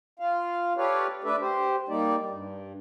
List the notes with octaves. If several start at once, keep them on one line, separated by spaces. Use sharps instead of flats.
F4 F5
G4 A4 B4 C#5 D5 F5
A3 D4 A4 B4 D5 E5
G4 C5
G3 A#3 D#4 D5
G2